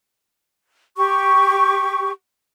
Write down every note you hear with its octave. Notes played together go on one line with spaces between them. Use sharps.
G4 C#6